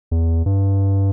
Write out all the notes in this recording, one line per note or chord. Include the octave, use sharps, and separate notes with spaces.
E2
G2